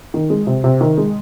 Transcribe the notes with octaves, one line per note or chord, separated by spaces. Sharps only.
D#3
G#3
C3
C3
D#3
G#3